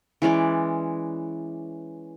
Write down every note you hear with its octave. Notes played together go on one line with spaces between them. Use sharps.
E3 G#3 C#4 D5